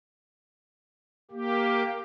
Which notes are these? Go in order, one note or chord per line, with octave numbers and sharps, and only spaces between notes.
A#3 G4